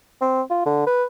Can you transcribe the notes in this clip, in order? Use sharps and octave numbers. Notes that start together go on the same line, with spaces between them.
C4
F4
D3
B4